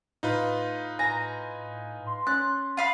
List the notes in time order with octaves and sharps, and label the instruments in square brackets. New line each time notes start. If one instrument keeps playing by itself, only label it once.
[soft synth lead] A2 [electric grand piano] D#4 F4 B4
[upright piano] G#5 [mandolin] A#5
[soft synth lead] C6
[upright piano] C#4 A6 [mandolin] F#6
[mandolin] F4 F5 B5